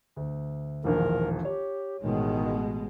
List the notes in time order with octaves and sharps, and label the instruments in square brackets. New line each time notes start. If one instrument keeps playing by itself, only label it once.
[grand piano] D2
[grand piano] E1 A#1 D#3 [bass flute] A#4
[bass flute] G4 [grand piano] C#5
[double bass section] A1 B2 G#3 [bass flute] D#3